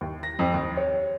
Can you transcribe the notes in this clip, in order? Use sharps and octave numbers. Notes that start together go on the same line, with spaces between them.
D#2
A#6
F2
D#2
C#5